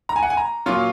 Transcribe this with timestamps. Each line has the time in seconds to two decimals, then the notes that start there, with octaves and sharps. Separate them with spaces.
0.09 A#5
0.16 G#5
0.23 F#5
0.30 G#5
0.37 A#5
0.66 A#2 F#3 C#4 F4